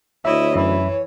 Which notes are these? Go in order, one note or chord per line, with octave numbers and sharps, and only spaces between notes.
D2 E4 C#5 D#5 E5
F#2 E3 E5 B5